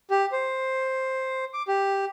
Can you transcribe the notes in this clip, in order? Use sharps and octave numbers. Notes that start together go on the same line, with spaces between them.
G4
C5
D6
G4